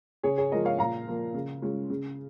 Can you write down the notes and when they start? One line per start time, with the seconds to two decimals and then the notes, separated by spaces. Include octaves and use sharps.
0.23 C#3 G#4 C#5
0.38 G#4 C#5
0.52 F3 G#3 F4 A#4 D#5
0.65 C#5 F5
0.79 A#2 F5 A#5
1.07 F3 A#3
1.34 C#3
1.62 G#3 C#4 F4
1.90 C#3